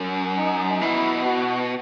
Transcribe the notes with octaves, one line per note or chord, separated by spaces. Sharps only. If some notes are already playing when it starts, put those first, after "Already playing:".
Already playing: F#2
D#4
B2 E4
F#4